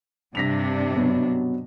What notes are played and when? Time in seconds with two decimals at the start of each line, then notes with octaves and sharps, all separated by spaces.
0.35 G2 C3 D4 A#6 B6 F7
0.95 B2 F#3 B3